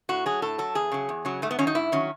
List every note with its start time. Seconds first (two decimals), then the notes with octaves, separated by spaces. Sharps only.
0.09 A2 F#4
0.26 F#3 G#4
0.42 A2 A4
0.58 F#3 A4
0.75 E2 G#4
0.92 C#3 F#3
1.09 E2
1.25 C#3 F#3
1.42 G#2 A3
1.51 B3
1.59 D#3 F#3 C#4
1.67 D#4
1.75 G#2 E4
1.92 D#3 F#3 C#4